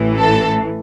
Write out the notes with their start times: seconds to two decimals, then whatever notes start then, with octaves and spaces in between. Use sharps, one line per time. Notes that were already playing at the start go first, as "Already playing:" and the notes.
Already playing: A1 A2 E3
0.17 A4